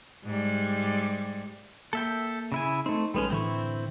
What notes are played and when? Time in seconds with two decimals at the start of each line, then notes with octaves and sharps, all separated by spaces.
0.25 G#2 G3
1.93 A#3 A4 E5 G5
2.52 C#3 E4 G#5
2.86 A3 C4 D#4
3.14 A#1 G3 G#3 C#4 A4 B4
3.30 A2 D3 E3 C4 E4 C#6